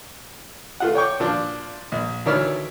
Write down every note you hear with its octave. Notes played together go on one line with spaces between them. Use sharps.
A3 F4 F#5
C#5 G5 C#6 D6
A#2 F3 D4
A#1
D2 D#3 E3 C#5 E6 F6